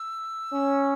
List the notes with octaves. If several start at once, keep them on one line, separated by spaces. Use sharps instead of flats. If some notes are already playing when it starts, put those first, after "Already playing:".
Already playing: E6
C#4